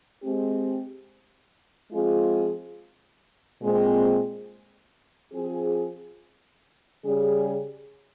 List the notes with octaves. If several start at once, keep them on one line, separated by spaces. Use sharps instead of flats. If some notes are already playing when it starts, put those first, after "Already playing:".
G#3 C4 G4
F3 G#3 C4 F4 G#4
A#2 G#3 C4
F3 C4 F4 G#4
C#3 G3 C#4 G#4